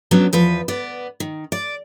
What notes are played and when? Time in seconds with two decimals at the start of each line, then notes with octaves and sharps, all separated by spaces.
0.11 F#2 F#3 B3 D4
0.33 E2 F3 B4
0.68 B3 D5
1.20 D#3
1.52 D5